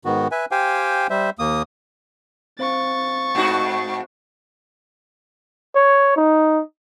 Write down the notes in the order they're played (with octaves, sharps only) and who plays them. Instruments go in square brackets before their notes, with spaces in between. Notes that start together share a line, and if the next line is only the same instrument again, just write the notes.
[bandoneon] G#2 D#3 B3 F#4
B4 E5 G#5
G4 C5 F5 G5 G#5
G3 C5 E5
D#2 A#3 D#6
[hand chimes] C4 C5 F5 [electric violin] C#6 A6
[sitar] G#2 D#4 F#4
[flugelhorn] C#5
D#4